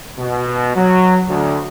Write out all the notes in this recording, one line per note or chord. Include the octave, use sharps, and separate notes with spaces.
B2
F#3
D2